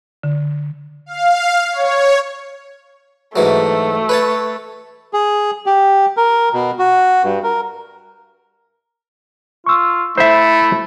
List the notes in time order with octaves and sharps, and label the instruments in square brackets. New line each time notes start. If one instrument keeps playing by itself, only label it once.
[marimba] D3
[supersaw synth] F5
C#5
[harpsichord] G#2 E3 F#3 [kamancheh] A3
[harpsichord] B4 C#5 A5
[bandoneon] G#4
G4
A#4
B2
F#4
G2
A#4
[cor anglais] F4 [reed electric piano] C#6 E6
[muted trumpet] A3 [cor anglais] E4 [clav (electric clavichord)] C5 E5